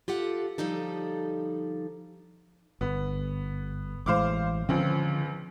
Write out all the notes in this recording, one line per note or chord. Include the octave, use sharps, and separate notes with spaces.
F4 G4 A4 F#5
D3 F3 G3 D#4 A4
G1 B3
A1 E3 G#3 C5 F5 D6
C#2 D3 F3 C4 C#4